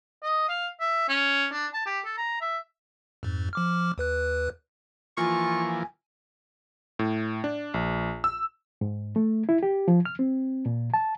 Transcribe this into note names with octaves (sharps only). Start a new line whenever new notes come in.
D#5
F5
E5
C#4
D4
A5
G4
A4
A#5
E5
F2 G#2
F3 D6 F6
D#2 B4 F#6
E3 F3 A#3 F4 G#5 C#6
A2
D4
A#1
E6
G#2
A3
E4
G4
F3
F6
C4
A#2
A5